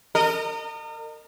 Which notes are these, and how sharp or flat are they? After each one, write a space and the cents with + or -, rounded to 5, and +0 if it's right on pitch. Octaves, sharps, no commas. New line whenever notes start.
A#4 -35 D#5 -30